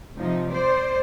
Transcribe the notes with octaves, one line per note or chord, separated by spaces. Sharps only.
C3 F3 D#4
C5 D5